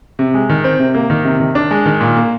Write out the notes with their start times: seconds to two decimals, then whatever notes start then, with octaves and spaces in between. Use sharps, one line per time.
0.19 C3
0.34 G#3
0.49 D#3
0.64 C4
0.80 C3
0.95 A#3
1.10 D#3
1.25 C3
1.40 D#3
1.55 D4
1.71 G#3
1.86 D#3
2.01 A#2
2.16 A#3